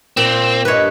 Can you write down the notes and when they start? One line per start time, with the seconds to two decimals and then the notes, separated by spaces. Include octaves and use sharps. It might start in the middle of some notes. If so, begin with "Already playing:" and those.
0.17 A#2 C4
0.65 G2 B4 C#5 D#5